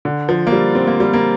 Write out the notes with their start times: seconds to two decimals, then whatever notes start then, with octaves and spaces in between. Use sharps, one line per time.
0.05 D3
0.29 F3
0.47 A#3
0.52 G3
0.75 C4
0.87 A#3
1.00 G3
1.13 A#3